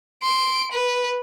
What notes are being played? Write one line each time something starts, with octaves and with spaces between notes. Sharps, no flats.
C6 D7
B4